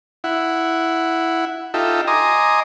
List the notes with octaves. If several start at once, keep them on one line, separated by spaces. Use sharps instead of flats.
E4 F#5
D#4 F4 G4 A4 E5
D#5 G#5 A#5 C6 D6 D#6